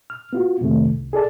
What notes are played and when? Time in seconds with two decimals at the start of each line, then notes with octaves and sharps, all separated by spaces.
0.10 F6
0.33 B3 F4 F#4
0.61 F2 C3 D#3 A3
0.88 C2
1.13 G#4 A4 D5 A5